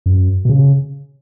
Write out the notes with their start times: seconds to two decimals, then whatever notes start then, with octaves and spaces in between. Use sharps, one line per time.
0.06 F#2
0.45 B2
0.49 C#3